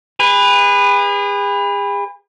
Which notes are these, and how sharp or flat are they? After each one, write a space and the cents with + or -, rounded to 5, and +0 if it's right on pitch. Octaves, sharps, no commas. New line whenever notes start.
G#4 -40 B4 +0